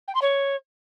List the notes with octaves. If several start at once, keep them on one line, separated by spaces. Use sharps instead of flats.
G5
C6
C#5